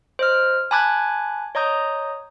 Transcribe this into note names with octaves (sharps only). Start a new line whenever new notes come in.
C5 D#5 F6
G#5 A5 B5 D6 F#6 G#6
C#5 D#5 A#5 D#6 G6